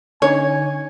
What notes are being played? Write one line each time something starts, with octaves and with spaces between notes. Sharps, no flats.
D3 C#4 D#4 C#5 G#5